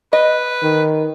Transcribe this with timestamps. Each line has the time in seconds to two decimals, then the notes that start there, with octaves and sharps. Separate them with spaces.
0.13 B4 D#5
0.63 D#3